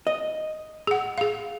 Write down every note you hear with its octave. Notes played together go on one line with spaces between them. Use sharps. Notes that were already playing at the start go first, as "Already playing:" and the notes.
D#5
G#4 F#5
G#4 F5